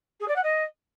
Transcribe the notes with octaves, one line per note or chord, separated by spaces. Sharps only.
G#4
D5
F#5
D#5